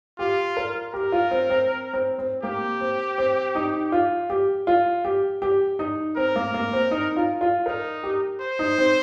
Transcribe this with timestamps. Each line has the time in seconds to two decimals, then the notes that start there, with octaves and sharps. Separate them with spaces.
0.19 F4 G4
0.57 A#4
0.93 G4 A#4
1.12 F4
1.31 C4
1.50 C4
1.93 C4
2.19 C4
2.43 A#3 G4
2.81 C4
3.18 C4
3.55 D#4
3.92 F4
4.30 G4
4.67 F4
5.05 G4
5.42 G4
5.79 D#4
6.17 C4 A#4
6.36 A#3
6.54 A#3
6.73 C4
6.91 D#4
7.17 F4
7.41 F4
7.66 D#4 A#4
8.03 G4
8.41 C5
8.59 D#4
8.78 C4